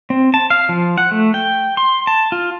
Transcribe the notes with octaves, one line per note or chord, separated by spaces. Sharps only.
C4
A5
F5
F3
F#5
A3
G5
C6
A5
F4